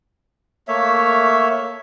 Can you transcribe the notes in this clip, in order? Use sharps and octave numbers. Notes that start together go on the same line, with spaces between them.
A3 A#3 C#5 E5